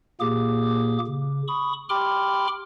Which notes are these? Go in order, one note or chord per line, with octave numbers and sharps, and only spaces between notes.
A#2 A#3 G4 G#4 D6
C#3
B5 C#6 D#6
G4 G5 B5 C6 D6 F6